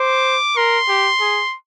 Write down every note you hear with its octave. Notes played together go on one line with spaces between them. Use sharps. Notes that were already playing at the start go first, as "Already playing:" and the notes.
Already playing: C5 D6
A#4 C6
G4
G#4